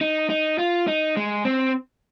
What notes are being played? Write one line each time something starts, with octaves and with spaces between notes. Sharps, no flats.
D#4
D#4
F4
D#4
G#3
C4